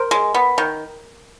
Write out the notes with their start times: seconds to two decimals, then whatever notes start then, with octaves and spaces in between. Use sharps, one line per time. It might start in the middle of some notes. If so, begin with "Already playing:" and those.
Already playing: A#4 C5
0.11 G#3
0.34 B3
0.58 D#3